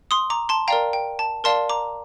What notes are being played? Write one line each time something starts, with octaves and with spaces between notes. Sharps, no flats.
C6 D#6
A#5 D6
A5 C6
A#4 D5 F5 G5 A#5
G5
A5
A#4 D5 F5 A5 C6
A#5 D6